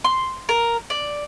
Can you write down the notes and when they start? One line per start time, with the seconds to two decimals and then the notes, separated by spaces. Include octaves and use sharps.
0.04 C6
0.49 A#4
0.90 D5